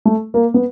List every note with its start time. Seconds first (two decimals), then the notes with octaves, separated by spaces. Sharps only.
0.05 A3
0.34 A#3
0.54 B3